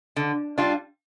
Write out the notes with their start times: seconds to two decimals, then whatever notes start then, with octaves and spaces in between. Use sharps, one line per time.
0.16 D3
0.58 G3 D4 F4